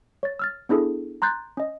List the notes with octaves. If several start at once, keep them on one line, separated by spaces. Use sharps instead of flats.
C#5 A6
E6 F6 A6
B3 D4 E4 G#4 A4
A#5 C6 F#6 G6 A6
C#4 D#5